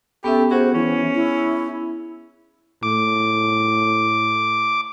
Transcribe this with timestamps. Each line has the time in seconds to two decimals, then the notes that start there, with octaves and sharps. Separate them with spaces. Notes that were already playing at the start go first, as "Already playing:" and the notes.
0.24 B3 C#4 G4 A4 E5
0.51 F#4 G#4 C5
0.74 E3 C#4
1.15 E4
2.83 A2 D6